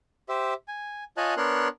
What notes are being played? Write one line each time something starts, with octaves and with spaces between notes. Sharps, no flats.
G4 C5 E5
G#5
F4 C#5 D#5 G#5 A5 F#6
B3 D4 A#4 C#5 C6 F#6